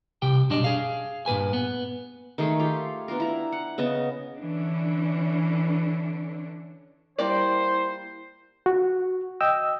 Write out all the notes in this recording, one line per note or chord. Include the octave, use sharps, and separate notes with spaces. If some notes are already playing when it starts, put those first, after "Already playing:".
C2 C3 G4 G5
F#2 B2 G3 D4 D5 D#5
G#4 F5
G2 A#2 B4 G#5
B3
D#3 G#3 A3 G#4
F4 G4 F5
B3 D4 F4 A#4
E4 A#5
F#5
C#3 B3 D#5 A5
D3 E3 C#4 D4
G3 A#3 E4 C5 D5
F#4
D#5 G5 E6